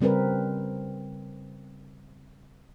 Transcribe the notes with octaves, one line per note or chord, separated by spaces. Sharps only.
C#3 G3 C4 A#4 B4